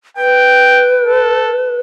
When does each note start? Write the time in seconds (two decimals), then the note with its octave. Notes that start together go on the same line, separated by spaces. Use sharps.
0.17 B4 G5
1.05 A4